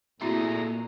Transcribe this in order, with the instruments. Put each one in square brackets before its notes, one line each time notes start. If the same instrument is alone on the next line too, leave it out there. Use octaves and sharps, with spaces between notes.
[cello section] A#2 [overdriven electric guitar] A3 G#4 [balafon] C4 E4 F#4 [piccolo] A#5